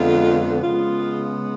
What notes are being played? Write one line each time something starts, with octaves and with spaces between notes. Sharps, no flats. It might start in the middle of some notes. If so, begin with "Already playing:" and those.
Already playing: F2 D3 G#3 B3 F4
C#3 G#3 B3 F4